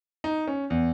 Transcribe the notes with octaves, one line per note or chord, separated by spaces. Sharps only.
D#4
C#4
E2